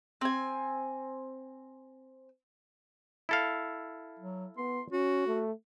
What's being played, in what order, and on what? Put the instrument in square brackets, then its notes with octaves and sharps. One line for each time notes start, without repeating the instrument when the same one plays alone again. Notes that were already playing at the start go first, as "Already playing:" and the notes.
[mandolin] C4 G#5
[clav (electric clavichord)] E4 A4 F5
[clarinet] F#3
[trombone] B3 [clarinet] C6
[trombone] C#4 [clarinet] F#4
[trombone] A3